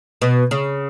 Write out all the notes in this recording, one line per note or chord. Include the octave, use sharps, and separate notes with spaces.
B2
C#3